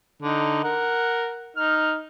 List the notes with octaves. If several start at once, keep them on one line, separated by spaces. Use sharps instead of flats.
D3 D#4
A#4 F#5
D#4 F6